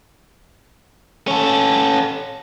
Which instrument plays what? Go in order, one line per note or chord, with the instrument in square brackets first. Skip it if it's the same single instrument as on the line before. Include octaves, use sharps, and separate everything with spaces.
[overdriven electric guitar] C#4 A4